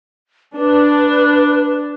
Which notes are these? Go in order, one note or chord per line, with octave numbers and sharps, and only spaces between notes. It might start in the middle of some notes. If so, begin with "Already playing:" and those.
D4 B4